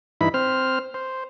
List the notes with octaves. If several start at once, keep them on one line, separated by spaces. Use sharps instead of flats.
G2 E3 D#4 E4 B5
C4 C5 F6
C5